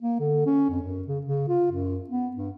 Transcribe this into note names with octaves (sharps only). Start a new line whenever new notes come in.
A#3
D3
C#4
F2
F#2
C#3
C#3
F4
F#2
B3
G2